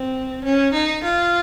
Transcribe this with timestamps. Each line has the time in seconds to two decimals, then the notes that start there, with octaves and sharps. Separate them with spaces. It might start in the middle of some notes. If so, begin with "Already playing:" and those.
Already playing: C4
0.44 C#4
0.73 D#4
1.03 F4